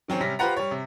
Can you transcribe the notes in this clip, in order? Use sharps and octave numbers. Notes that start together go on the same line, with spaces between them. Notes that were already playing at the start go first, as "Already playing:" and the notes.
D#3 F#3 C4 C#4
C3 G3 C#4 A#6 B6
F4 G4 B4 C5 F#5 A#5
G3 C#5
C3